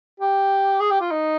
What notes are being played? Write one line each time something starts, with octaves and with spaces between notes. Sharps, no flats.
G4
G#4
G4
F4
D#4